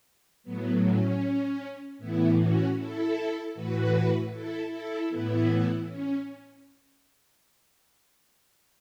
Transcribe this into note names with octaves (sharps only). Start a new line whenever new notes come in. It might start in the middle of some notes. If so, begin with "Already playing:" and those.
A2 F#3 B3
C#4
A2 E3 B3 E4
C#4 F#4
E4 A4
A2 E3 F#4 B4
E4 A4
E4 A4
A2 E3 B3 E4
C#4